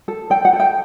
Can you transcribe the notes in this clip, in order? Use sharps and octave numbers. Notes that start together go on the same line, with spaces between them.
A4
A4 G5
F#5
A4
G5